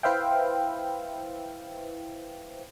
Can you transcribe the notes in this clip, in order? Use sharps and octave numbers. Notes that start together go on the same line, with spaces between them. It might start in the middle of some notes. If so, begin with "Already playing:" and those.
E4 B4 C5 E5 F5 G5